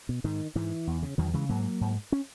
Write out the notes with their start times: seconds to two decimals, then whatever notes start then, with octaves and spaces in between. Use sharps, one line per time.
0.09 B2
0.24 G#2 D#3
0.55 G#2 E3
0.87 E2
1.03 C#3
1.18 E2 D#3 F#3
1.34 C#3 E3 G#3
1.49 G#2 F#3 A#3
1.81 G#2
2.12 C#4